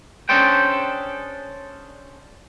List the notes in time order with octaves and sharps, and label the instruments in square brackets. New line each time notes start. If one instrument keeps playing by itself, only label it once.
[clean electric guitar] C#4 D4 G#4 A4 C5 G5